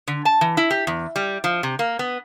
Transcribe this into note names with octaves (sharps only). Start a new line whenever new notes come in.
D3
A5
E3
E4
G4
E2
G3
F3
C3
A#3
B3